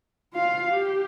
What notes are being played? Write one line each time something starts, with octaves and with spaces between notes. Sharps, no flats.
F4 F5
G4